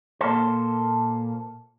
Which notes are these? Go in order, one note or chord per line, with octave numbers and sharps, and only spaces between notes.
A#2 A#3 A4 C5